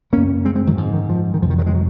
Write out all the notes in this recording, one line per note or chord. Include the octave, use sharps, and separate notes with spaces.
F#2 C#3 A#3 C#4
G#3 C4
G#3 C4
D#3 F#3
G#2 F3
D#3
F3
D#3
F2 C3 D#3 F3
D#3 F#3
F3 G#3
F#3